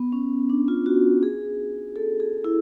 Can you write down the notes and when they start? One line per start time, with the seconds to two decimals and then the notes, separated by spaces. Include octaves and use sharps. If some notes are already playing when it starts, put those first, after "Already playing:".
Already playing: B3
0.12 C#4
0.50 D4
0.68 F4
0.86 F#4
1.23 G#4
1.96 A4
2.20 G#4
2.44 E4